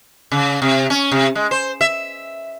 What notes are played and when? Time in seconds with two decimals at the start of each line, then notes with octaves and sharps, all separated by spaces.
0.32 C#3
0.62 C3
0.90 C#4
1.12 C3
1.35 G#3
1.51 C5
1.81 E5